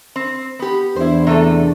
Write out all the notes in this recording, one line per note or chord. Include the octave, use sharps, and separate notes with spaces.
C4
B3 G4
E2 D4 E4 C5
C3 A3 A4